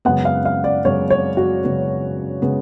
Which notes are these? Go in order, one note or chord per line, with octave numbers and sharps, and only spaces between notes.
F#2 C#3 G#3 B3 F#5
F5
F5
D5
F#2 C#3 G#3 B3 C#5
C#5
F#4
F#2 C#3 G#3 B3
C#3 G#3 B3